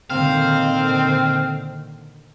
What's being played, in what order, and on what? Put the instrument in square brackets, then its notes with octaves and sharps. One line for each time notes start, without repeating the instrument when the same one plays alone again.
[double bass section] A#2 D3 D#3 [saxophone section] C4 [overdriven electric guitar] F5